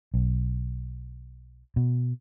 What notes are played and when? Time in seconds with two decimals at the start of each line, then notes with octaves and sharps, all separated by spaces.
0.14 B1
1.76 B2